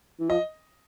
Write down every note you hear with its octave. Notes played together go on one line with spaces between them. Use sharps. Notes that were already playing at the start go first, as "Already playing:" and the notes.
E3
F3 D#5